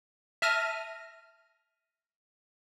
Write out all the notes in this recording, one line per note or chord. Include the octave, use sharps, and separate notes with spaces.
E5 A5 F6 A#6 D#7